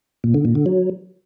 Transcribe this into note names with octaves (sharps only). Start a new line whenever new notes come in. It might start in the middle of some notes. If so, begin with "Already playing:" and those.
A#2
D3
A#2
D3
F#3